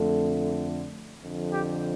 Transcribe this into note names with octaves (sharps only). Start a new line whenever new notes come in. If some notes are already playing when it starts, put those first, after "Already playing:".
Already playing: F2 D3 A3
F2 D3 F3
G4